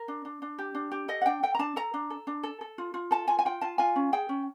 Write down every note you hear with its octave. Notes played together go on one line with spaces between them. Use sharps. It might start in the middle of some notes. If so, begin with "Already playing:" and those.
Already playing: A#4
D4
D4
D4
G4
D4
G4
A4 D#5
F#5
D4 G5
A4 G5
A#5
D4 A5
A4 A#5
D4
A4
D4
A4
A4
F4
F4
A4 A5
F4 G#5
G#5
F4 G5
F4 A5
F4 G#5
C#4
G#4 G5
C#4